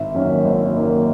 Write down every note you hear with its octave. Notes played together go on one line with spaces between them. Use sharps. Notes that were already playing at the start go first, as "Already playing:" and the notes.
Already playing: G#1 E5
F#2 D#3 A#3 C#4
G#1
F#2 D#3 A#3 C#4